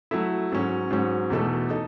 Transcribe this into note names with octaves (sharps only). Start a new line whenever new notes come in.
F#3 A3 E4
G#2 F#3 C#4
G#2 F#3 C#4
E2 B2 A3 D#4 A4
D#4 A4